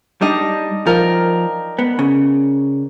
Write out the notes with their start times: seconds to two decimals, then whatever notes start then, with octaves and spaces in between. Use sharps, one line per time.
0.21 G3 D4 D#4 D#5
0.87 F3 A#4 G5
1.79 B3
1.99 C#3